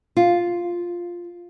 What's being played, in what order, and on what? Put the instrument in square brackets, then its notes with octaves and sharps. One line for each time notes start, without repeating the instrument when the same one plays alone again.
[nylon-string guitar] F4